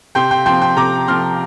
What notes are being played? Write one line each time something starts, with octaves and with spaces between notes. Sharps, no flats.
C3 G5 C6
G5 C6
F3 C4 G5 C6
G5 C6
C3 A#5 D6
F3 C4 C6 F6